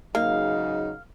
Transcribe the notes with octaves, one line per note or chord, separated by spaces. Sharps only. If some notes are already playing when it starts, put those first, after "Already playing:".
G#2 C#3 F#3 A#3 D#4 F5